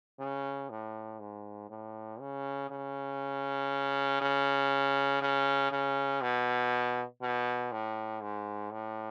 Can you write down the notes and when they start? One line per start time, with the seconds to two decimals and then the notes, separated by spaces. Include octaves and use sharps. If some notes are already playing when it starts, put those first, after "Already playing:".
0.19 C#3
0.70 A2
1.20 G#2
1.70 A2
2.20 C#3
2.70 C#3
4.21 C#3
5.22 C#3
5.71 C#3
6.21 B2
7.22 B2
7.72 A2
8.22 G#2
8.72 A2